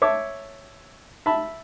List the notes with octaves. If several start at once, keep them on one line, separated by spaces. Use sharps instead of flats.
C#5 E5 A5 D6
E5 A5 B5